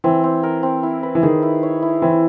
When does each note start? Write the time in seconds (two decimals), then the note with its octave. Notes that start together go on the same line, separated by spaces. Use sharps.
0.04 E3 C4
0.24 C4
0.43 A#4
0.63 C4
0.83 E4
1.03 B4
1.15 E3
1.23 D#3 G#4
1.42 E4
1.63 C#5
1.82 E4
2.02 E3 C4